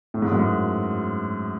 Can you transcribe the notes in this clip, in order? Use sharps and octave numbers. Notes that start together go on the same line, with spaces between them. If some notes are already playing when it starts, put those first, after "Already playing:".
A2
G#2
F#2
G#2